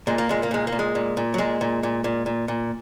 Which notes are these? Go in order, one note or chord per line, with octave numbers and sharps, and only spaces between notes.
A#2 G#3
A#3
A#2 G#3
A#3
A#2 G#3
A#3
A#2
G#3
A#2
A#2
F#3
A#2 G#3
A#2
A#2
A#2
A#2
A#2